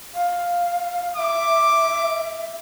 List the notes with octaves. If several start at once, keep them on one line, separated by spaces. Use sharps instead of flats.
F5
E5 D6